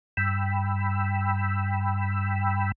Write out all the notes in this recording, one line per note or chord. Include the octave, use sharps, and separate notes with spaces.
G2 G5 B5 E6